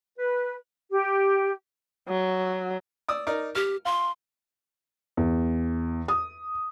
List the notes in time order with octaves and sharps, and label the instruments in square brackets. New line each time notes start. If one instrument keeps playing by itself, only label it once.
[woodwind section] B4
[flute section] G4
[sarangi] F#3
[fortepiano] D5 D#6 E6
D#4 A#4 D5
[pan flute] G4 [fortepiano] F6
[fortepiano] F4 [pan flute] C6
[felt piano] E2
D#6